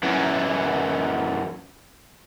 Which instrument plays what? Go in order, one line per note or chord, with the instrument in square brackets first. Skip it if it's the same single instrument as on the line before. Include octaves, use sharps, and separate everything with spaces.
[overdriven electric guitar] F#2 E3